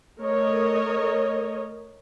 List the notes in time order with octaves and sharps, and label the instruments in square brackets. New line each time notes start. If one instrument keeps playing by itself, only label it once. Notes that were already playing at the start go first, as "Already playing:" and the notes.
[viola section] A3 A#4 C#5 D#5